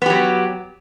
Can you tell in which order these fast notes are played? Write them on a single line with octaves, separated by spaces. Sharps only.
B3 G4 F#3